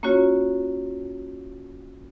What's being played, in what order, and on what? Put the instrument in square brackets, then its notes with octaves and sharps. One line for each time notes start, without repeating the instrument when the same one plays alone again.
[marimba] A#3 C#4 F4 F#4 C#5